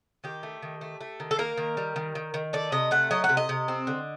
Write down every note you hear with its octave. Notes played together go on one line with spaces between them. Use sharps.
D#3 G4
A3
D#3
A3
A3
D#3
A4
A#3 A#4
D#3
G3
D#3
D#3
D#3
A3 D5
C3 D#5
A3 F#5
F#3 D#5
F#5
C3
D#5
C3
C4
D3